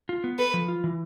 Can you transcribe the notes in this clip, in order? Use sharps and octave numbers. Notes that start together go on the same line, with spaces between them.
F4
B3
A4 B4
F3
F4
E3